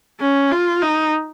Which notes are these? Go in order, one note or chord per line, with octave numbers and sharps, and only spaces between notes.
C#4
F4
D#4